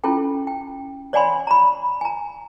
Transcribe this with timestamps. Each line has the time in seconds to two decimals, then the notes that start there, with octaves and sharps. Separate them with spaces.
0.04 C#4 E4 F4 A4 G5
0.47 G5
1.13 C#5 D5 F#5 G#5 B5 C6
1.47 A#5 B5
2.01 G#5 A#5